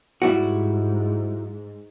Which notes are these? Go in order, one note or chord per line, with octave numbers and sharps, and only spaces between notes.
G#2 G3 E4 F#4